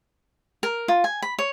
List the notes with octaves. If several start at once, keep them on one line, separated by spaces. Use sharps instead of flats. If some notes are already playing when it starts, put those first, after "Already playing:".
A#4
F4
G#5
B5
C#5